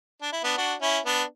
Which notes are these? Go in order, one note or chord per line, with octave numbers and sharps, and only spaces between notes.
D4
E4
B3 D4
D4 F#4
C#4 E4
B3 D4